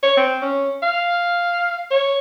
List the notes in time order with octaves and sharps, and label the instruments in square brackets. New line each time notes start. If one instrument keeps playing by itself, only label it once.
[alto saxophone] C#5
C4
C#4
F5
C#5